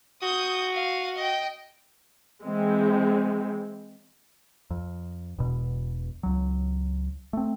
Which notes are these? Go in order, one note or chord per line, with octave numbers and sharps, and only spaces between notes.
F#4 D#6 G6
F5 D#7
D#5 G5
E3 G#3 C4
F2
E1 E2 B2
C#2 F#3
A3 C4